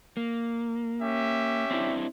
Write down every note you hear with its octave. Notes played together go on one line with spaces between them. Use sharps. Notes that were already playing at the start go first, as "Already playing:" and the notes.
A#3
C#4 G4 E5
C4 D4 E4